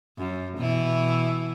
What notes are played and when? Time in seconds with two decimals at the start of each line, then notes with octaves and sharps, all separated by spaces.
0.18 F#2
0.57 B2 E3 E4